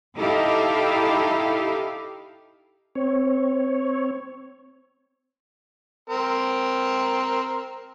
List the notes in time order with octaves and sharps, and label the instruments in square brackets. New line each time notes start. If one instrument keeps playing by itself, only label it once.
[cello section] D#4 E4 G4 A4 D#5 F5
[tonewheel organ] C4 C#5
[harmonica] C4 A#4